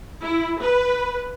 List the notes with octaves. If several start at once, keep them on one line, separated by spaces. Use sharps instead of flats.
E4
B4